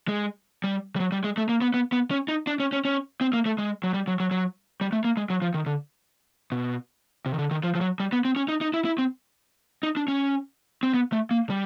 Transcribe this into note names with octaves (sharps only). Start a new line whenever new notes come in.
G#3
G3
G3
F#3
G3
G#3
A3
A#3
B3
B3
B3
C#4
D#4
D4
C#4
C#4
C#4
C4
A#3
A3
G#3
F#3
G3
F#3
F#3
F#3
G3
A3
A#3
G#3
F#3
F3
D#3
D3
B2
C3
D#3
D3
D#3
F3
F3
F#3
G3
B3
C4
C#4
D#4
D#4
E4
E4
C4
D#4
D4
C#4
C4
B3
A3
A#3
G3